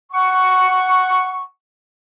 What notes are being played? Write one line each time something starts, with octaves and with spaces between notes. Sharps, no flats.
F#5 C#6